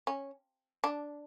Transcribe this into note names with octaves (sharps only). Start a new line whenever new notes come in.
C#4
D4